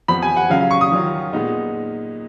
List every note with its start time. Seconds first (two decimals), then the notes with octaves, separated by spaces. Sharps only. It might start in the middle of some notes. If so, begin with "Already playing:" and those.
0.08 F2 F3 B3 B5
0.22 G#5
0.36 F#5
0.50 C#3 F#3 C#4 F5
0.61 F5
0.71 C#6
0.81 D#6
0.92 D#3 F#3 C#4 F4
1.33 A#2 G#3 B3 D#4